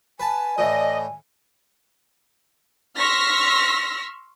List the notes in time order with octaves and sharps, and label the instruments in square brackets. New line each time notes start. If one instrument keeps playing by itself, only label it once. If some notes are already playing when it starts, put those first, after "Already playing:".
[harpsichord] B4 A5 [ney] G#5
[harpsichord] A2 E3 [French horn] D5 [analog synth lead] D#5
[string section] C6 C#6 E6 F6 A#6 B6